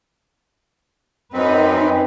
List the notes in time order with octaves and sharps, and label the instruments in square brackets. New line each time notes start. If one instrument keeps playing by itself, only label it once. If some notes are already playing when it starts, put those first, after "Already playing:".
[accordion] F#2 C4 [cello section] D#4 B4